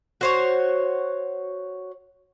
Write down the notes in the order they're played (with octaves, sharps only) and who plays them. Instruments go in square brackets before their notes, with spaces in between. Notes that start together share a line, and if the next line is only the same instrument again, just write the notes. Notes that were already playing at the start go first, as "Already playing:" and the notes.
[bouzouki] F#4 C5 C#5